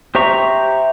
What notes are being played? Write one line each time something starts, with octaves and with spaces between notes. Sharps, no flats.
G4 C5 E5 A#5 C#6